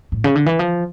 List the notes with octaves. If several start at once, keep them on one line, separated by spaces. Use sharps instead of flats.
A2
C#3
D3
E3
F3